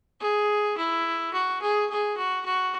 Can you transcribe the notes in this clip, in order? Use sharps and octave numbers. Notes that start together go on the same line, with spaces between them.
G#4
E4
F#4
G#4
G#4
F#4
F#4